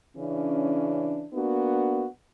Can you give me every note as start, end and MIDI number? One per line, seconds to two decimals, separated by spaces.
0.16 1.24 49
0.16 1.24 52
0.16 1.24 61
0.16 1.24 62
1.32 2.05 58
1.32 2.05 59
1.32 2.05 62
1.32 2.05 66